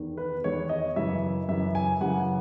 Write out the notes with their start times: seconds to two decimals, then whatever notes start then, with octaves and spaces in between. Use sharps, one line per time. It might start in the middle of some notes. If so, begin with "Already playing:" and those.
Already playing: E2 D#3
0.17 B4
0.44 E2 D#3 C#5
0.69 D#5
0.96 F#2 C#3 E3 E5
1.48 F#2 C#3 E3 E5
1.75 G#5
2.01 F#2 C#3 E3 F#5